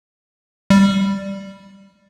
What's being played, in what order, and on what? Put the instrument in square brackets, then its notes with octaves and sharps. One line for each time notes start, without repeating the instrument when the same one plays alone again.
[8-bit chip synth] G3